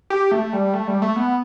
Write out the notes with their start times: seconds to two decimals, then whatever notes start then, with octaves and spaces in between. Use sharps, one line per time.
0.10 G4
0.31 A3
0.53 G3
0.74 A3
0.88 G3
1.02 A3
1.16 B3